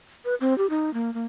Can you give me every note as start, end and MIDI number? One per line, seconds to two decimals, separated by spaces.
0.25 0.35 71
0.41 0.56 60
0.58 0.69 67
0.70 0.93 63
0.94 1.13 58
1.14 1.26 58